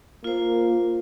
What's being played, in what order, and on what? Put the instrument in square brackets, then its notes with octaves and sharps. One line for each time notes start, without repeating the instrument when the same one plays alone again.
[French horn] A#3 [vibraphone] F4 C5